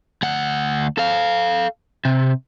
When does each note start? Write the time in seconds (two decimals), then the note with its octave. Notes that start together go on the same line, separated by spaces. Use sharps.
0.23 D2 F#5
0.98 A4 F5
2.05 C3